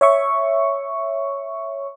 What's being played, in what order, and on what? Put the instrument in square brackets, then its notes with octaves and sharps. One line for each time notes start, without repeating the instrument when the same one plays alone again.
[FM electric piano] C#5 E5 C#6